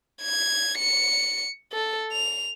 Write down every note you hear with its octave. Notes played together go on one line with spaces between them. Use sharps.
G#6
C#7
A4
F7